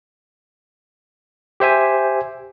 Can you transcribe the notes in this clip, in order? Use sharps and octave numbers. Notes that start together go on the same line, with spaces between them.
G4 C5 E5 G#5